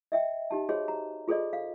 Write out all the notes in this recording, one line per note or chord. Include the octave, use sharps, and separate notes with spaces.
D#5 E5 G5
D#4 G4 A5
F#4 G#4 C5 C#5 D#5
A#5
F4 G#4 A4 C5 D5 D#5
F5